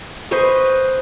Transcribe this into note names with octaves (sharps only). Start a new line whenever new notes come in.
B4 C5 D#5 C#6